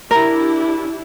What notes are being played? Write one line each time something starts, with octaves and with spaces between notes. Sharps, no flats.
D4 E4 G4 A#4